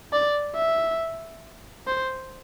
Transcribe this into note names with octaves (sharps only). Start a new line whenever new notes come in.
D5
E5
C5